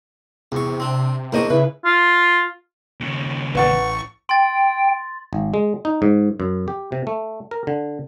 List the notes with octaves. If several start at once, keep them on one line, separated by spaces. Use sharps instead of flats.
E2 C3 C#6
C4 D4
E2 A#3 D4 C5 D#5 C#6
C#3 E4 B4
F4
D#2 C#3
A1 B4 F#5 C#6 A6
G5 C6 A6
G#1
G#3
D#4
G#2
F#2
G4
C3
A3
A#4
D3